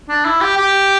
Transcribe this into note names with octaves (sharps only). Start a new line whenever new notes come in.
D4
E4
G4
G4